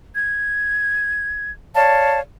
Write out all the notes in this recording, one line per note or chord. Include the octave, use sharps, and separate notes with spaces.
G#6
C#5 D5 F5 A5